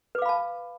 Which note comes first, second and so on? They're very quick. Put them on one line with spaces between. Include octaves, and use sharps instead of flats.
B4 D6 F5 B5 A5